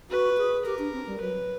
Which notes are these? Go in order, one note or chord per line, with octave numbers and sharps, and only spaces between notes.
F#4 B4
G#4
G4 A#4
D4
C4
G3
F#3 B4